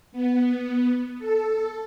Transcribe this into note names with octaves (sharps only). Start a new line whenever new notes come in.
B3
A4